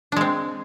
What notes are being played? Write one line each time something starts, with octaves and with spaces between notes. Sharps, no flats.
G#3 C4 D4